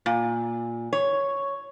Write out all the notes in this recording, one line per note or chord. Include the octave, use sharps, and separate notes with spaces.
A#2
C#5